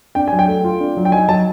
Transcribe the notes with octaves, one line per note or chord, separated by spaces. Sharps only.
D4 G5
F#3 G#5
G5
A3
F4
D4
F#3
G5
D#4 G#5
F#3 A5